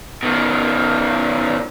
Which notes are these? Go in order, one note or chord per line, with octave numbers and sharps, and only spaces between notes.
B2 D#3